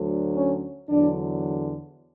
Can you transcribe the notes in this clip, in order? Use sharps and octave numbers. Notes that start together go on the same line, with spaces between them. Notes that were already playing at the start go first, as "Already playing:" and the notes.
Already playing: D2 D3 F#3
C#4
E2 D3 F#3 D4